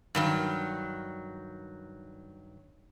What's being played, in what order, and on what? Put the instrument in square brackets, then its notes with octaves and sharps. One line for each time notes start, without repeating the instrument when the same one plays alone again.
[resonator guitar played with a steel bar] G2 D#3 F#3